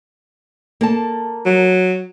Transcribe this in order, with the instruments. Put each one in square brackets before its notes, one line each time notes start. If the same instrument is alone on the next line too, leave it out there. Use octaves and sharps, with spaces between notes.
[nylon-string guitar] A#3 A4 A5
[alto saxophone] F#3